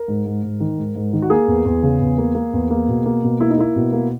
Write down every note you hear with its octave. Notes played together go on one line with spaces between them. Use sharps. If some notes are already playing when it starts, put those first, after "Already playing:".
Already playing: A#4
G#2
G#2
G#2
D#3
G#2
G#2
D#3
F#4
A#3 G#4
E2
E2
C#3
E2
A#3
A#3
E2
A#3
B2
A#3
B2
A#3 E4
D#4
A#3 E4
B2
A#3